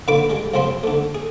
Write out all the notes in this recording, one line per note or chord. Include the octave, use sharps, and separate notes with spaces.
A#2 D3 B4 D5 B5 D6
G3 G#3
C2 F#2 G#3 C4 C5 B5
D3 A3
G#4